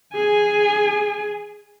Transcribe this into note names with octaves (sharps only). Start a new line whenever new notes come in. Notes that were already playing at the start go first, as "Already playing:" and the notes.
G#4 G#5